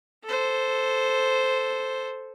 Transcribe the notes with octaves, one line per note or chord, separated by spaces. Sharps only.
A4 C5